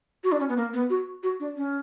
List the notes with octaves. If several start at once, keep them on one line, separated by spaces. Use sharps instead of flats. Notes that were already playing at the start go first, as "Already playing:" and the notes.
F#4
D4
C#4
B3
A#3
B3
F#4
F#4
D4
C#4